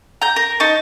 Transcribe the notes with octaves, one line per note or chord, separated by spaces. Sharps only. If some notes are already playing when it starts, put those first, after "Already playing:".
A#5 G6
A#4
D#4 A5 C#6